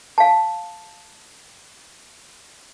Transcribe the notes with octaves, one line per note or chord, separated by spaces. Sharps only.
F5 A5